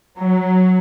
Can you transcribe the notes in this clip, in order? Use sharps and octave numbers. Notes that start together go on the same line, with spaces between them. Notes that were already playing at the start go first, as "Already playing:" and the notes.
F#3